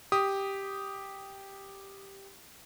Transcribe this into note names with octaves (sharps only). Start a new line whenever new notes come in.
G4 D#6